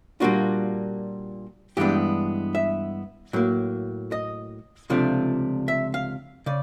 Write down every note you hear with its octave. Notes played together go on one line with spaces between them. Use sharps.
A#2 G3 A#3 D4 F4 F#4
G2 E3 G#3 B3 D4 G4
E5
A2 F#3 A#3
D#5
C#2 C3 F3 A3 D4
E5
F5
C#3 D5